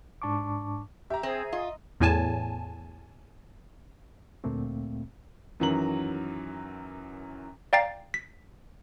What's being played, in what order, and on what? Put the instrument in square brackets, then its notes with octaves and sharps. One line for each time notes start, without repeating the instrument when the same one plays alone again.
[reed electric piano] G#2 D4 A5 C#6 D6
[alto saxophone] G4 [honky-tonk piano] E5 A#5
[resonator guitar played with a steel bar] C4 [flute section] G#4 [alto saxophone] C5
[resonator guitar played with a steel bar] F4 [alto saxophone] D#5
[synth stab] E2 A2 G#5 A5
[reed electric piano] D2 A#2 A3 A#3 C4
[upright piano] F#2 D#3 E3 F#3 A#5 F#7
[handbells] D5 F5 G5 A#5 A6 C7
B6